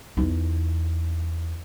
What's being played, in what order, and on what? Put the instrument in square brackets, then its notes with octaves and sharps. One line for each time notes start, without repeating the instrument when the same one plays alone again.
[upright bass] E2 D#4